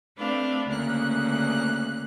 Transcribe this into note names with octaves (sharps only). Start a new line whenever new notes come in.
A3 C4 D4 B4 F5
D2 C#3 A#3 F#6